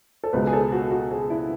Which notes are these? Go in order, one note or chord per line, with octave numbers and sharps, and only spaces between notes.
A4
C#2 B2 G#3 B4
G#4
A4
F#4
F#4
G#4
E4